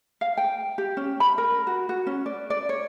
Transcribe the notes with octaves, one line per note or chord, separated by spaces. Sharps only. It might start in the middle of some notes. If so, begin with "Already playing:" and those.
F5
G5
G4
C#4
B5
A#4
F#4
F#4
C#4
D5
D5
C#5